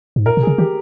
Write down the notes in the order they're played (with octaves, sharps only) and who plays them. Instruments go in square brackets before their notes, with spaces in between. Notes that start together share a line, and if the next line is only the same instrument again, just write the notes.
[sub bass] G#2
[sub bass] A#2 [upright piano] A#4
[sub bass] B2
[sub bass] C#3 [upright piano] G#4
[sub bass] D#3 [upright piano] G4